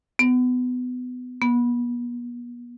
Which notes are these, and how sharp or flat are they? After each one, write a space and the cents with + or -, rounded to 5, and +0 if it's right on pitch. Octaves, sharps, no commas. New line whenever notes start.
B3 +20
B3 -40